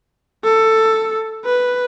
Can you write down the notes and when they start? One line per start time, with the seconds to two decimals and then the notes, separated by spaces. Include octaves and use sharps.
0.45 A4
1.45 B4